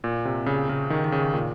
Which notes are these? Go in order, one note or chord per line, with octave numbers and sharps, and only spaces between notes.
A#2
C3
C#3
C#3
D#3
D#3
C#3
A#2